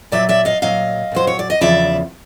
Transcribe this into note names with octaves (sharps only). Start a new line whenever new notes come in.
A#2 F#3 D5 E5
D5 E5
D#5 F5
A#2 F#3 D#5 F5
A#2 F#3 C5
C#5
D5
D#5
E2 C#3 F3 D5 E5